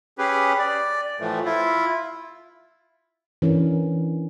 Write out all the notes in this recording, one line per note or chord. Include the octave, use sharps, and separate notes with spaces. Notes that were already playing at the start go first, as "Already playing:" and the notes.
C#4 G4 G#4 B4
D5
A2 E3 F3 A3
E4 F4
E3 C#4 D4 A#4